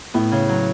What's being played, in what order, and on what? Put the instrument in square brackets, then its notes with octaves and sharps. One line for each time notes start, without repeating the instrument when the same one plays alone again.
[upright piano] A2 [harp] B3
[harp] C#3
F#3